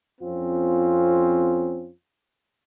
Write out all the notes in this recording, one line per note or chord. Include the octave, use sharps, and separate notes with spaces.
F2 C4 C#4 F4